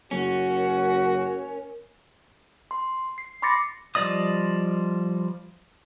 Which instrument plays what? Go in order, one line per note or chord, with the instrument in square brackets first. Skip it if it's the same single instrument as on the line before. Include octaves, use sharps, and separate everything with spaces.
[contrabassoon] F#1 [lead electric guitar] C#4 [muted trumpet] F#4 [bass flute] A#4
[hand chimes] C6
C7
B5 C6 D6 A6 A#6 C#7
[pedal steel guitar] F3 G3 D5 D#5 D#6